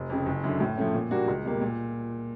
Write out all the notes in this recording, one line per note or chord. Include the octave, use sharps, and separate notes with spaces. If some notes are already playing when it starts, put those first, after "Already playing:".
Already playing: F1
F2 C#3
F#1
F#2 D3
A2
F3 A3 C#4
A#2
G3 A#3 D4 F#4
C#2
B2 G3 A#3
A#2